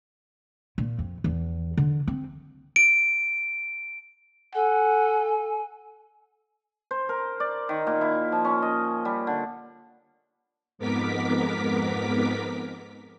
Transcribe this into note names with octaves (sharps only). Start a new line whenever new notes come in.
A#2
F2
E2
D3
C4
D7
A4 F#5 G#5
C5
A#4
D5
D#3
A#2
E4
F3
C#4
D#5
G3
D3
F2 G#2 B3 A#4 D6 B6